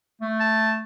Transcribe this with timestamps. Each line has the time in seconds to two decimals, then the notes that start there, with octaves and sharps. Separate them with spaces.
0.22 A3
0.40 A5